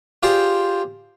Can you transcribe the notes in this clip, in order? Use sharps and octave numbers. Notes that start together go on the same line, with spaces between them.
F4 G4 G#4 C5 D5 G5